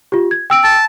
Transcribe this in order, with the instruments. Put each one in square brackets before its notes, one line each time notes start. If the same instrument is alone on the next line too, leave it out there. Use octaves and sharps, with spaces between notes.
[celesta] F4 G4
G#6
G5 E6 D7
[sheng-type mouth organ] A5